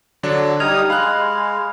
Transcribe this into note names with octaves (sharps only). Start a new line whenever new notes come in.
D3 F#3 D4
G3 D#4 D#5 D#6 F6 G#6 F7
G#3 F5 B5 F#6